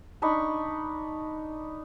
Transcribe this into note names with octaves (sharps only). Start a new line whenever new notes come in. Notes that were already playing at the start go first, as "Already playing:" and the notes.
D4 D#4 B5 C#6